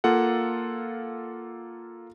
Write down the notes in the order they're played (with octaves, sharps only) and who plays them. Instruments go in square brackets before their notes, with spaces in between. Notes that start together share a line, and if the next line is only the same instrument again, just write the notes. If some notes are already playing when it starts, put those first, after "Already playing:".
[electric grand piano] A#3 F4 A4 F#5